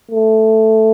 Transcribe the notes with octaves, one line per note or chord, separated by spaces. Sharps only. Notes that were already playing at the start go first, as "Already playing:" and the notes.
A3